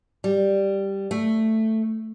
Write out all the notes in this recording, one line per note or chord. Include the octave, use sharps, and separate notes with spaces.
G3
A3